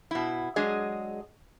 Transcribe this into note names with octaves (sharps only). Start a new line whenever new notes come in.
B2 E4
F#3 G#3 D4 G#4 D#5